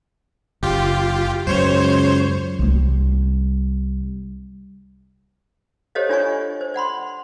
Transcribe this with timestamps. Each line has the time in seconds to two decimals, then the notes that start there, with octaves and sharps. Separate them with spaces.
0.63 F#1 F4 G4
1.47 C#2 F#2 F#3 C5 C#5
2.59 C2 G3
5.95 G4 A4 C5 C#5 D#5 F5
6.09 D4 F4 C#5 D5 G#5 C#6
6.61 C5
6.74 D5 F#5 B5 C6